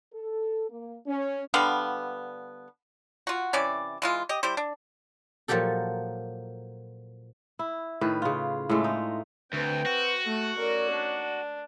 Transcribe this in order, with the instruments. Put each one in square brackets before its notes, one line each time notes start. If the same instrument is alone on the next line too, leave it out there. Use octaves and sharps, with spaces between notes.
[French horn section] A4
A#3
C#4
[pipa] D3 G3 B3 F5
F4 F#4
C3 E3 C#4 D5
E3 G#3 F4
G4 D#5
G3 E4 G4 C5
D4
[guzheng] A#2 F3 F#3 G4 A4
[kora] E4
A2 D#3 B4
C#3 F4
A2 G#3 A3 F4
D#4
[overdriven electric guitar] D2 [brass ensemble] C4 B4 [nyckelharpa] G5
[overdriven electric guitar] F#4
[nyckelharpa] A3
[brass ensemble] C#4 D#4 D5 [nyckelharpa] A#4
[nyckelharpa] D4